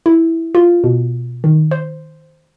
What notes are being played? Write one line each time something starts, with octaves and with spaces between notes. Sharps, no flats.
E4
F4
B2
D#3
C5